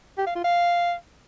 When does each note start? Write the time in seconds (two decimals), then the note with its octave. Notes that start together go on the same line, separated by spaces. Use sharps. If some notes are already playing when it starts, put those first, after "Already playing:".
0.18 G4
0.27 F5
0.35 F4
0.44 F5